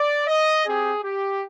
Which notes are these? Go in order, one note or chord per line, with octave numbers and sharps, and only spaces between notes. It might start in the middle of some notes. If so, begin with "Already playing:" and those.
Already playing: D5
D#5
C4 G4 G#4
G4